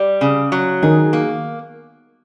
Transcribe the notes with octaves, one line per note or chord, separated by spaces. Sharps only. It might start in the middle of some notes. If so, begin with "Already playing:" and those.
Already playing: G3
C#3
F#3
D#3 G#4
A#3